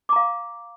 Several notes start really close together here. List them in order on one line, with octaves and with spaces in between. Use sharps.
D6 A#5 F5